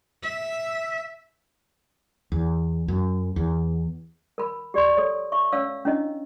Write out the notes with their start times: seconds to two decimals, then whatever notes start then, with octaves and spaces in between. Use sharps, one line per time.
0.24 E5
2.32 E2
2.88 F#2
3.36 E2
4.38 A#4 B5
4.74 G4 D5 C6 C#6
4.97 A4 C#5
5.32 E5 C#6
5.52 C#4 C#5 F5 E6
5.85 C#4 D4 E4 D#5